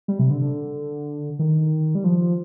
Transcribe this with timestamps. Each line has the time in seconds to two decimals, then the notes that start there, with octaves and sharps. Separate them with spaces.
0.08 G3
0.19 C3
0.30 D3
0.42 D3
1.39 D#3
1.95 G3
2.04 F3